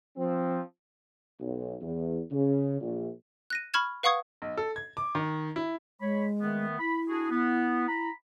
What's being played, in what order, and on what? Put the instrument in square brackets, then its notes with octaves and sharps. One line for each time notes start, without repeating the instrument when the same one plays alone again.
[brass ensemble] F3 C4
B1
E2
C#3
A#1
[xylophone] F#6 A#6 D#7
B5 C#6 F6 G#6 E7
B4 F5 F#5 C#6 D#6 G#6
[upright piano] B1
A4
G#6
D6
D#3
E4
[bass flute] G#3 [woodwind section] C#5 B5
[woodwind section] D#3 A3 B3
[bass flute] E4 [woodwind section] B5
[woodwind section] D4 F#4 G#4
B3
A#5 B5